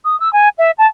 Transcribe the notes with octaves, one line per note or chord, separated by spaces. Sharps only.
D#6
E6
G#5
E5
A5